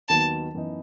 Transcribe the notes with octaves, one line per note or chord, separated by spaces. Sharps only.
D#2 D#3 F#3 B3 D#4 A5
F#2 E3 B3 D#4